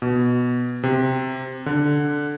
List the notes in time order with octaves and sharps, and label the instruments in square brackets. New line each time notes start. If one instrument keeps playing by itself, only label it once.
[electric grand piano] B2
C3
D3